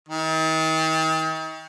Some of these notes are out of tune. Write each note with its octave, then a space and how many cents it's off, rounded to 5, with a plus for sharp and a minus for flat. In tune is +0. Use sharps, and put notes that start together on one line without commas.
D#3 +40